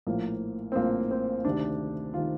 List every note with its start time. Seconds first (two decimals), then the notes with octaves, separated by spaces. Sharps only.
0.07 A#1 A2 F3 A#3
0.72 C4
0.75 A#1 A2 F3 A#3
1.11 C4
1.45 D2 C3 D#3 D4
2.14 C3 D#3 F4